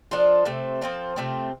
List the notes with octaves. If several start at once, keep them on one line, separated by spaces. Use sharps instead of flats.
F3 D4 F4 A4
C3 A3 C4
F3 C4 F4 A4
C3 A3 C4 F4